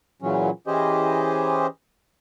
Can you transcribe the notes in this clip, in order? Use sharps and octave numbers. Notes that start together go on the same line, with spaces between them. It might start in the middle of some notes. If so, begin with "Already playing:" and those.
A#2 C#3 E3 F#3 C#4
E3 C#4 G4 G#4 C5 D#5